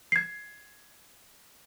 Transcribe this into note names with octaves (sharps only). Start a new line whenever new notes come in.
G#6 C7